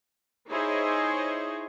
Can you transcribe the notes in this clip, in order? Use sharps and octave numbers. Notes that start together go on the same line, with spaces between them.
D#4 E4 G#4 C5 C#5 D#5